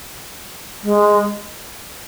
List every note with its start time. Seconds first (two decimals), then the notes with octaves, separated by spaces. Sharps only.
0.83 G#3